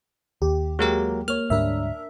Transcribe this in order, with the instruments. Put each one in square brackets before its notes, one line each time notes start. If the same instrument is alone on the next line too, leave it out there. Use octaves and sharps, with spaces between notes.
[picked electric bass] D#2 [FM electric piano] G4
[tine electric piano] F#3 A#3 A#4 [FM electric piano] G#3 G4
[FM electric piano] A#3 C#5 [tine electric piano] F6
[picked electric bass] D2 G#2 G3 [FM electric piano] D4 A#4 E5